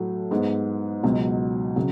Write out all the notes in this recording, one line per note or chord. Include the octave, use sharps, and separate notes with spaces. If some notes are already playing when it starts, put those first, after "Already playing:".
Already playing: A2 F#3 A3
G#2 G#3 B3
C#2 B2 F#3
C#3 F#3